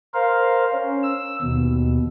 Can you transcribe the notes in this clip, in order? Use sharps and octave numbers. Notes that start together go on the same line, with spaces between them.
A#4 C5 F5
C#4
E6
D#2 B2